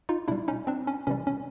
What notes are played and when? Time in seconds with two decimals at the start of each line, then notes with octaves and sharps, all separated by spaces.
0.09 D#4 F4
0.28 B2 G3 D4 E4
0.48 C#4 D#4
0.67 C4 D4
0.87 C#4
1.07 C3 E3 G3 C#4
1.27 C#4